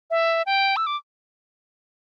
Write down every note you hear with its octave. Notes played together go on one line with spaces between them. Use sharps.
E5
G5
E6
D6